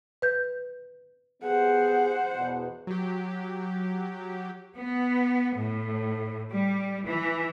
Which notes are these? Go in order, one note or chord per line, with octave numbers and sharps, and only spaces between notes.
B4 G6
B3 G4 G#4 C5 F#5
E2 B2
F#3 G4
B3
A2
G3
E3